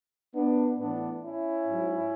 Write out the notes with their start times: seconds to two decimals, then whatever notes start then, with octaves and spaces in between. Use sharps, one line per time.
0.34 B3 D4
0.78 A2 E3 B3 D4
1.22 C#4 E4
1.67 G#2 F#3